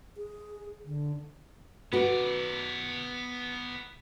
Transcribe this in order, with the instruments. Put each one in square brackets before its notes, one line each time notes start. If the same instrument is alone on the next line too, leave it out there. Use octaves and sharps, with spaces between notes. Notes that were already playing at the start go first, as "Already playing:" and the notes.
[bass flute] G#4
D3
[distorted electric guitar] B3 D5 [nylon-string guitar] F#4 B4